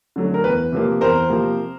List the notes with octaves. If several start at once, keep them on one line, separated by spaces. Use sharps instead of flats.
D3 F#3 A3
A#4
E2 B4
C3 F3 A#3
E2 A#4 C5
C3 F3 A#3